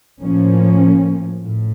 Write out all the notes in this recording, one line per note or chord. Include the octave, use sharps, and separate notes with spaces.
A2 F3 A#3 C#4
A2